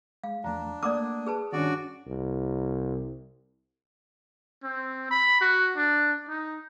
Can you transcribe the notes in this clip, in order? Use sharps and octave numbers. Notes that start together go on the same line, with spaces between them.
G#3 F5
E2 F3 A3 D4 A#5
A3 A#3 D5 F#5 A#5 D6 D#6
G#4 B4 A5
G2 D#3 C#4 D4 F#4 D5
C2
C4
B5
F#4
D4
D#4